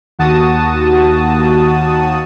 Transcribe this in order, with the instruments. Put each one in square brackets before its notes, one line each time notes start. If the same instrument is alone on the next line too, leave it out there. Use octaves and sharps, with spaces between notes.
[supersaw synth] D#2 F#4 A5 D#6